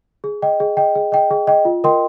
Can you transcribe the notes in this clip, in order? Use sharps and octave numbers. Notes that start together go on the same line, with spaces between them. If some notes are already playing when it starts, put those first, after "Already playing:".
G#4
D#5 G5
G#4
D#5 G5
G#4
D#5 G5
G#4
D#5 G5
F4
A#4 D#5 G5 C6